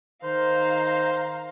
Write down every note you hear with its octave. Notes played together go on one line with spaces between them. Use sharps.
D#3 C5 F5 A#5